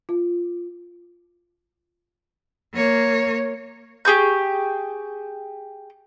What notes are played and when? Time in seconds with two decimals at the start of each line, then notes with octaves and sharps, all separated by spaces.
0.09 F4
2.73 A#3 C#5
4.05 G4 G#4 C#6 G6